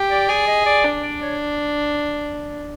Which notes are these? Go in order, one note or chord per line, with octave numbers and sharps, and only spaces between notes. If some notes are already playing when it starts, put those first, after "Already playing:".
Already playing: G4
D5
G#4 D5
D#5
D5
D4
D5
C#5